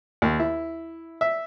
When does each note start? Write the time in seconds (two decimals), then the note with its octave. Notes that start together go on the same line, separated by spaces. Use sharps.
0.22 D#2
0.40 E4
1.21 E5